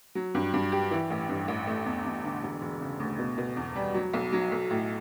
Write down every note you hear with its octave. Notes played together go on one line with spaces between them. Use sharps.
F#3
G2
G2
G4
E3
A1
G2
A1
A3
E2
E2
D3
E1
E1
C#3
D2
B2
B2
E2
G3
F#3
B1
F#3
B1
A2